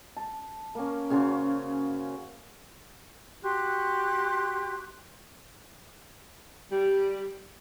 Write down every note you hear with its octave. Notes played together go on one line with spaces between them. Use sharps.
A5
A#3 C#4
C#3 C#4 F#4 C5
F#4 G4 C6 F#6
G3